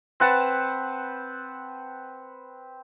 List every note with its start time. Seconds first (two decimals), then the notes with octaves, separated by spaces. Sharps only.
0.20 C4 B4 F#5 A5